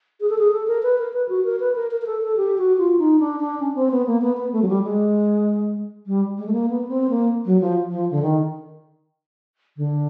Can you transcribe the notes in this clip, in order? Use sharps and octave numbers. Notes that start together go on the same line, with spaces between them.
G#4
A4
G#4
A4
A#4
B4
A#4
B4
F#4
A#4
B4
A#4
A#4
A#4
A4
A4
G4
F#4
F4
D#4
D4
D4
C#4
C4
B3
A#3
B3
B3
A3
F#3
G3
G#3
G3
G#3
A3
A#3
B3
C4
A#3
F#3
F3
F3
D3
D#3
D3